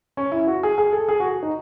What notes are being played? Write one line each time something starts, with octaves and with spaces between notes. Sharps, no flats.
C#4
E4
F#4
G#4
G#4
A4
G#4
F#4
D#4